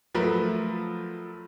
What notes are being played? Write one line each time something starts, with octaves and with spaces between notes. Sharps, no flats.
F3 F#3 A3 A#4 B4 B5